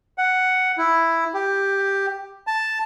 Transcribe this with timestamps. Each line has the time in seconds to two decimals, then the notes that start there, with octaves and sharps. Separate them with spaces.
0.18 F#5
0.78 E4
1.34 G4
2.47 A5